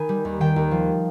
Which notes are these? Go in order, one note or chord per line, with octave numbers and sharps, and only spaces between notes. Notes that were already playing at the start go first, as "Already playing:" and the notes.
Already playing: D#3 G#5 B5
G3
D#2
D#3 G5
D#2
F3